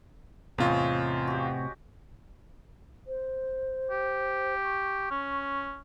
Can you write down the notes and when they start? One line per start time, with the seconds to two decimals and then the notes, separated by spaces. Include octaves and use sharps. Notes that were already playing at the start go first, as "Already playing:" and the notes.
0.58 E2 A2 C3 A3 C4 C#4 F4 D#5
1.27 F#4 G4
3.06 C5
3.91 G4
4.63 C#6
5.11 C#4